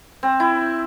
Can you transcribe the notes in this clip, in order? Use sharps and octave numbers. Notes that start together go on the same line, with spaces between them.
C4
E4